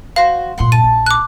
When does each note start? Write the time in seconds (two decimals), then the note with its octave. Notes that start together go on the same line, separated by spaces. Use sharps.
0.16 F#4 C5 F5
0.58 G2 A#2 F#5 C6
0.72 A5 D#7
0.84 A#1
1.06 D6 F#6